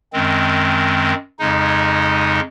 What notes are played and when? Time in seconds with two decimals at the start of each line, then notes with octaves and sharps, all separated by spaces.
0.13 F#2 D#3 G#3 C4
1.39 F2 C#3 G#3 D#4